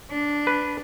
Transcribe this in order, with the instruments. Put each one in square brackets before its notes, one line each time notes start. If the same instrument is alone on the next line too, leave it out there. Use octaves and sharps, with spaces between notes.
[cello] D4
[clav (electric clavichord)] B4